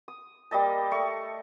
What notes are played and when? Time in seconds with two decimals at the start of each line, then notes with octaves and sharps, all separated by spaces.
0.08 D#6
0.51 G3 A#3 D#5 A5
0.91 A3 C#6